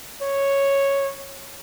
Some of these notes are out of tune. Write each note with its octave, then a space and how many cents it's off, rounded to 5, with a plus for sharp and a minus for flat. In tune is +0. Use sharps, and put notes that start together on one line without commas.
C#5 -5